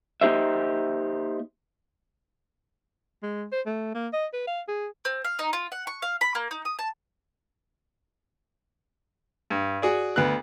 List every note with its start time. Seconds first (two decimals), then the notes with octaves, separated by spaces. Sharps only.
0.21 A#3 D#4 G4 C5 E5
3.22 G#3
3.52 C5
3.66 A3
3.94 A#3
4.13 D#5
4.33 B4
4.47 F5
4.68 G#4
5.05 C4
5.25 F5
5.39 D#4
5.53 F4
5.72 F#5
5.87 C#6
6.02 F5
6.21 B5
6.35 A#3
6.51 D#4
6.65 D#6
6.79 A5
9.50 G2
9.82 F#4 G#4 D5
10.16 D2 B3 F#6